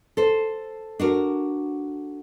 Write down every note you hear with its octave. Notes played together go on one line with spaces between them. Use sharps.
A4 C5
D4 F#4 A#4